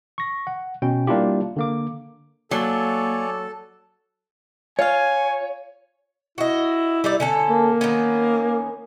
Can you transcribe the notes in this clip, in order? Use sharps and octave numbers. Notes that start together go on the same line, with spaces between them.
C#6 A#6
F#5
B2 C#4 G5
G3 A#3 D4 E4 F4 G4
D3 A#3 D6
F#3 A#3 A4 C#5 D5 G#5
F4 C#5 F5 G#5
E4 F#4 D#5
G3 D#4 D5
D3 C#4 A4
A#3
D#3 B3 C#4